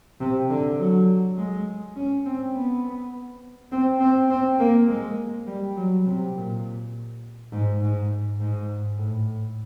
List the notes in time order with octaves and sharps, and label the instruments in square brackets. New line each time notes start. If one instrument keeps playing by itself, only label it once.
[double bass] C3
D3
F#3
G#3
C#4
C4
B3
C4
C4
C4
A#3
G#3
G3
F#3
C3
A#2
G#2
G#2
G#2
A2